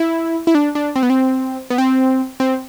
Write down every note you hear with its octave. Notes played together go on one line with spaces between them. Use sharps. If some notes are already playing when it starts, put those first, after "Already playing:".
Already playing: E4
E4
D4
D4
C4
B3
C4
B3
C4
C4